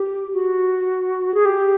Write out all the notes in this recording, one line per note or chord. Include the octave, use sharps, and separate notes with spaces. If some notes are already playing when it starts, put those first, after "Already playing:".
Already playing: G4
F#4
G#4
G4